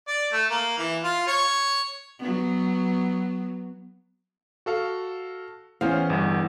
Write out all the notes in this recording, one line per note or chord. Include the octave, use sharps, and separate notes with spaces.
D5
A3
A#3
E3
F4
C#5
F#3 B3
F#4 A4 F5
E2 C#4 C5 F5
G1 G2